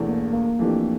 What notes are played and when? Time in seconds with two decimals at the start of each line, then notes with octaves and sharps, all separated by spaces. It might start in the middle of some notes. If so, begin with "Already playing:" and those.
Already playing: E1 E2 E3 A3
0.09 A#3
0.33 A#3
0.59 F2 E3 A3 D4 G4